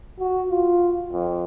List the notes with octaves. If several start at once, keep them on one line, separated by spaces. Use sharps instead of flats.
F#4
F4
F2